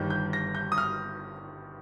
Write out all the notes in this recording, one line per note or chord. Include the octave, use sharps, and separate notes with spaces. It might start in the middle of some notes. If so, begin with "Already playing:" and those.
Already playing: G1 G2 D#3 G6
G6
A#6
G6
D#6
F6